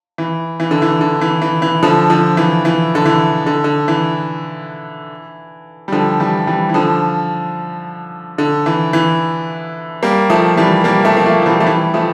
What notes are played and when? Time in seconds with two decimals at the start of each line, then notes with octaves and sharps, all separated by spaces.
0.18 E3
0.60 E3
0.71 D3
0.82 E3
1.01 D3
1.21 E3
1.42 E3
1.62 E3
1.83 D3 F3
2.10 D3 F3
2.37 E3
2.65 E3
2.95 D3
3.05 E3
3.46 D3
3.64 D3
3.88 E3
5.88 G3
5.92 D3 F3
6.20 E3 G3
6.47 E3 G3
6.69 E3
6.74 D3 F3
8.38 D3
8.66 E3
8.93 E3
10.03 G3 A#3
10.30 F3 A3
10.57 E3 G3
10.84 G3 A#3
11.05 F3 A3
11.17 A#3
11.26 F3 A3
11.42 F3
11.46 E3 G3
11.60 A3
11.67 E3 G3
11.94 F3 A3